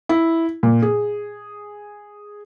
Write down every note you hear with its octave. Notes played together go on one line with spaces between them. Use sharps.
E4
A#2
G#4